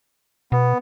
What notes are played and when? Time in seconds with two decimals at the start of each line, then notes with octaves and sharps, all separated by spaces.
0.52 B2 B3